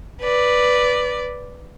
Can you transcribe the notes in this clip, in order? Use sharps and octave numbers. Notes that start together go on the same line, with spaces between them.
B4 D5